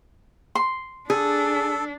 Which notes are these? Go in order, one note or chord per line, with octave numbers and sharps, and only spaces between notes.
C6
D4 G#4 A4